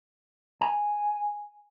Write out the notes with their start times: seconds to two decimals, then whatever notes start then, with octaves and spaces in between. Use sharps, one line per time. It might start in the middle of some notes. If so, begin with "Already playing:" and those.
0.61 G#5